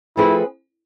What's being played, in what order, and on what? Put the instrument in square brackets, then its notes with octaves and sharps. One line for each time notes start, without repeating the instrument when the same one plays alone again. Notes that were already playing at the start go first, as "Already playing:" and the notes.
[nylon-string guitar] F3 A3 C4 G#4 B4 [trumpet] E4